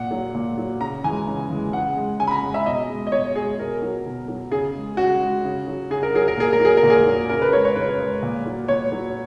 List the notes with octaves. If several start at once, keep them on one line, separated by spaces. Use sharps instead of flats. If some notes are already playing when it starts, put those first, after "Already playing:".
Already playing: A#2 F#5
F#3
A#2
F#3
C#3 A#5
E3 G#3 G#5
C#3
E3 G#3
C#3 F#5
G#3
C#3 G#5
B5
A#5
G#3
E5
B2 D#5
G#3
D#5
B2 C#5
G#3 G#4
B2 A#4
F#3
B2
F#3
C#3 G#4
G#3
C#3 F#4
G#3
C#3
F#3
C#3 G#4
A#4
F#3 G#4
A#4
A#2 G#4
A#4
F#3 G#4
A#4
A#2
G#4
F#3
C#3 A#4
B4
G#3 C#5
C#5
C#3 B4
G#3
A#2
F#3
A#2 C#5
F#3